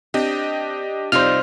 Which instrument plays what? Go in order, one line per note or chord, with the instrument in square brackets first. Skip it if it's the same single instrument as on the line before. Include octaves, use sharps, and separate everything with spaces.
[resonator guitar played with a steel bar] C4 [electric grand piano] D4 G4 D#5
[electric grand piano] C3 C4 [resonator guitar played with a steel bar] G3 D#4 F4 [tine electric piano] C5 F6